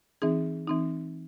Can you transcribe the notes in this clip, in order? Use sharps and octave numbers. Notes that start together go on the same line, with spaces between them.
E3 C4 D#4 G#4
E3 C4 D#4